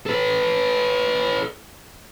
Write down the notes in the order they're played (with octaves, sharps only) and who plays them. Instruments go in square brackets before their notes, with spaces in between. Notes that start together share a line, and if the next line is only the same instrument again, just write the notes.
[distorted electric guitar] A4 B4